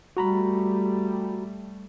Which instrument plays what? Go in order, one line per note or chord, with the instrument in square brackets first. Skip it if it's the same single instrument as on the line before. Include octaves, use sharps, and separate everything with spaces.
[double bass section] G3 A3 [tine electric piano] F#4 A#5 B5